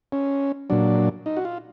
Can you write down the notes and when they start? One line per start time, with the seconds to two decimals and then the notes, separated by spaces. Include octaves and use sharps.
0.12 C#4
0.70 A#2 F#3 D4
1.26 D#4
1.37 F#4
1.45 F4